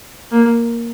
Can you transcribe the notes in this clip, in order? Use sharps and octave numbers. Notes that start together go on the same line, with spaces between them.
A#3